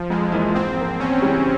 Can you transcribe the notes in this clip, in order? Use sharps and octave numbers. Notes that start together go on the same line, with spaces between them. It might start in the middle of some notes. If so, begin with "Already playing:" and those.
Already playing: F3
F2 G#3
E3 A#3 F4
G#2 C4
F3 A#3
E2 C#4
C#3 E3 G3 C4